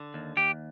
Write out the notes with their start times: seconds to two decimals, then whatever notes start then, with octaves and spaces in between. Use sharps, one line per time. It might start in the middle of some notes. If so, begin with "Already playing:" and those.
Already playing: D3
0.14 D#2
0.37 D#2 G4